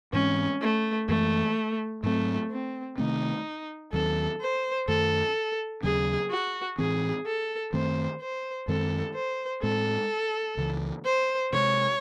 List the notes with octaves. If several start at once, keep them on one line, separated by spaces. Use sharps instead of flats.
G#2 E3 G#3 C4 C#4
A3
F#2 E3 G#3 A3
G#2 F#3 A3 C4
C4
C3 D#3 A3 C4 D#4
D#2 D#3 F#3 C4 A4
C5
F#2 D#3 A3 A4
D#2 C#3 F#3 C#4 G#4
F#4
A2 E3 C4 G#4
A4
F#2 D#3 A3 C4 C5
C5
F#2 D#3 G#3 C4 A4
C5
A2 G#3 C4 A4
C#2 C#3 E3
C5
C3 E3 G#3 C#5